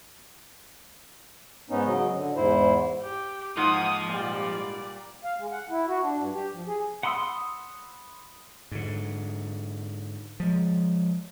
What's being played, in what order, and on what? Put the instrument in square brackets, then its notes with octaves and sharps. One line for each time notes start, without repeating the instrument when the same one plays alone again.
[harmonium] G#2 B3 C#4 D#4
C#3 F#3 D#5
D3
E2 G#2 E4 C5
[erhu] G4
[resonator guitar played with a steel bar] G#2 [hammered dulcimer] A#3 F#5 [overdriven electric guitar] F4 C5 [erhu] D#6
[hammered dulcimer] A#2 G3 [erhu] D5
[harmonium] F5
G#3
F#5
E4
F#4
D4
G2
G4
F3
G#4
[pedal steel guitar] F#5 B5 C6 D#6 E6
[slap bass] G#2 D3
F3 G#3